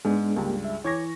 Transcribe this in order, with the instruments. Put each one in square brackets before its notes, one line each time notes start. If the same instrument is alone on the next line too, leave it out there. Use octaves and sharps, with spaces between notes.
[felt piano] G#2 [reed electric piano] G#3 B3 D4
[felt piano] C#2 G2 [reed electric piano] A#3 G4
[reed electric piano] E5
[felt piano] E3 C#6 A#6 [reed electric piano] C#5 D6 G#6